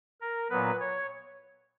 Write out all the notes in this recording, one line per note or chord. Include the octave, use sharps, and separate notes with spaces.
A#4
A#2 F#3 B3 B4
C#5